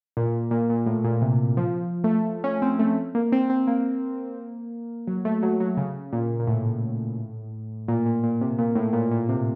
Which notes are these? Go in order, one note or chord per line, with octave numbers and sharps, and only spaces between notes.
A#2
A#2
A#2
A2
A#2
C3
F3
A3
C#4
C4
A3
A#3
C4
C4
A#3
F#3
A3
F#3
F#3
C#3
A#2
A#2
A2
A#2
A#2
A#2
C3
A#2
A2
A#2
A#2
C3